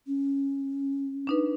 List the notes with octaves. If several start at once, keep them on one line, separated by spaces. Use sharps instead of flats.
C#4
D4 D#4 B4